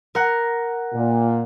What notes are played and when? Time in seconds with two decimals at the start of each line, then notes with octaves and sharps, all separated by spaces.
0.15 A#4 F#5
0.94 A#2